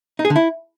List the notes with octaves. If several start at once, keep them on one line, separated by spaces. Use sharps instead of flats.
D#4
G#4
D3
E4